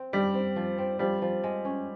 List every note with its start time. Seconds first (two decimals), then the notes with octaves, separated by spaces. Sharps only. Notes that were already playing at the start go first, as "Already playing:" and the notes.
Already playing: C4
0.13 G3 G4
0.34 C4
0.56 F3
0.78 C4
0.99 F3 G3
1.22 F3
1.44 G#3
1.65 C#4